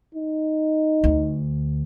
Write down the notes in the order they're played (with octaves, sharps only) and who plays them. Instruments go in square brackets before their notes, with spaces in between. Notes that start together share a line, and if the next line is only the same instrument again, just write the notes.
[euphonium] D#4
[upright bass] D2